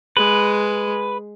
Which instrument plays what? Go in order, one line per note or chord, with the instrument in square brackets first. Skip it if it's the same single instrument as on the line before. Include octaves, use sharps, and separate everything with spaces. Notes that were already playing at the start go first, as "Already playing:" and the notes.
[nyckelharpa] G#3 [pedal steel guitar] B4